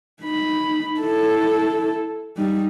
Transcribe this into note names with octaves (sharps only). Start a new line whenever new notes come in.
D#4 B5
E4 A4
G3 D#4